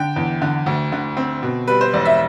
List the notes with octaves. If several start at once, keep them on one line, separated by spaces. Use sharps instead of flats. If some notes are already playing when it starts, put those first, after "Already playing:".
Already playing: D3 G5
E2
D3
D2
D3
C4
B2
G3 B4
C5
E1 D5
E5